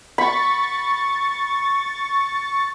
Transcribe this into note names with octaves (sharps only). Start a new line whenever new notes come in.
B5 C#6 A6